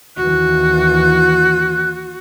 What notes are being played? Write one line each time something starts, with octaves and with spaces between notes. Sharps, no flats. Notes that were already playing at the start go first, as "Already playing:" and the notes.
D#2 E3 F#4 F#6